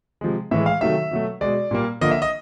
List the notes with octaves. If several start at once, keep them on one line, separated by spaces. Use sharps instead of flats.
C3 F3 G#3
A2 E3 G#3 E5
F5
C3 D#3 F#3 A3 E5
B2 F#3 A3
B2 G#3 D5
A#2 G3 A#3
D3 F3 A#3 D#5
E5
D#5